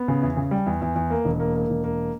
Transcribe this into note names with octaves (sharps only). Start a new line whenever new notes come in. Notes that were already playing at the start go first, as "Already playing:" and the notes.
Already playing: B3
C#3
E2
C#3
G3
E2
E2
E2
A#3
E1
A#3
A#3
E1
A#3